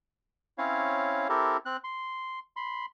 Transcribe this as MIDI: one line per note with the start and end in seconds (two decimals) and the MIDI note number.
0.58 1.28 60
0.58 1.28 61
0.58 1.28 64
0.58 1.28 73
0.58 1.28 77
1.29 1.57 60
1.29 1.57 64
1.29 1.57 67
1.29 1.57 69
1.29 1.57 70
1.66 1.77 60
1.66 1.77 90
1.84 2.39 84
2.56 2.86 83
2.56 2.86 84